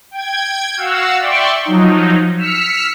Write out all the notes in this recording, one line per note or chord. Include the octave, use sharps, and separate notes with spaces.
G5 G#6
F#4 F5 F#5 E6
D5 E5 G5 C6 C#6
F3 F#3 D#4
E6 F6 B6 C#7